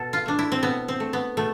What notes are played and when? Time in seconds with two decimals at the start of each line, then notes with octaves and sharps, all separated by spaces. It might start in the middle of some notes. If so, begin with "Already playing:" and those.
Already playing: B2 A4
0.13 F4
0.26 A3 D4
0.39 E4
0.52 C4
0.63 B2 B3
0.88 C4
1.00 A3
1.13 B3
1.37 B2 A3